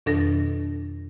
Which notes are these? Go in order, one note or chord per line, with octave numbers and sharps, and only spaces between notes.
F2 B2 D#3 D4 A4 A#6